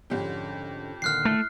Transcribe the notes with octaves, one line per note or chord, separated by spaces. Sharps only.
F2 G#2 D3 C#4 G4
A#2 D3 D#3 F6 F#6 C7
A3 E4